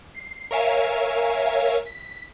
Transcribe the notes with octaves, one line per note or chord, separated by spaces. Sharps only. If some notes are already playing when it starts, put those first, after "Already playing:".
C7
A#4 C#5 E5 F5 G#5
B6